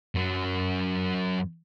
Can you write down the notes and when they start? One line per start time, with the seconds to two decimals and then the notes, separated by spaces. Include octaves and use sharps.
0.15 F#2 F#3